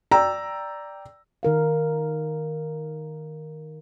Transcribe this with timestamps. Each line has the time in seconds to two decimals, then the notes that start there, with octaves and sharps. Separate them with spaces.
0.11 D5 G5 A#5 E6
1.43 D#3 A#4 F5